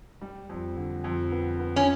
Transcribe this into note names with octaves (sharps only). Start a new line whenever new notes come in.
G3
F2
D3
F2
B3
B3
C#4